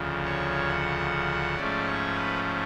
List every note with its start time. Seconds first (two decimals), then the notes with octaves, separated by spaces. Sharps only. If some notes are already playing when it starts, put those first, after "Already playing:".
Already playing: D2 C#3 F3
0.25 C#5
0.68 F#5
1.56 G#2 F3 A3 C#4 D5
1.86 C#5
2.15 B4